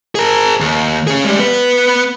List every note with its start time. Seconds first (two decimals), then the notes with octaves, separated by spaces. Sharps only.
0.15 G#4 A#4
0.61 D#2
1.07 C#4 G#4
1.25 G3 G#3
1.38 B3 B4